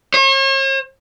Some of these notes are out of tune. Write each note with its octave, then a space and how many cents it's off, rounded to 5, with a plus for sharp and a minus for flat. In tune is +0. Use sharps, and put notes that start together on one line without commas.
C#5 -45